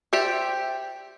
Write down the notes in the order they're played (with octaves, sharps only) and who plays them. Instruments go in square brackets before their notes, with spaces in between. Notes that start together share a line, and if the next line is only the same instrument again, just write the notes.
[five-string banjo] G4 C5 D5 E5